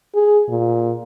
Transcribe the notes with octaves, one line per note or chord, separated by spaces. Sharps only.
G#4
A#2